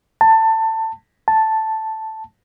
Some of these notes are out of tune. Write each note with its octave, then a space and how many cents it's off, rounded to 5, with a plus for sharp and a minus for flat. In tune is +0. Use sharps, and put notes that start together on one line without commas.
A5 +20
A5 +0